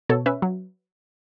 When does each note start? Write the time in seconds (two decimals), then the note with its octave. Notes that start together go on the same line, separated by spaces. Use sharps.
0.09 B2 A4 C#5
0.26 C#4 B4 E5
0.42 F#3